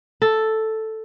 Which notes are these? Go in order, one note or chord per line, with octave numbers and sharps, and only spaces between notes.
A4